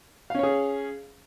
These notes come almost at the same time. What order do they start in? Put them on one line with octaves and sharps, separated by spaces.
F5 C#4 C#5 G#4